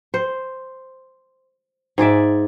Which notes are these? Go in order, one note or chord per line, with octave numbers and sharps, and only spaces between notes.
C5
G#2 G#4 D5 E5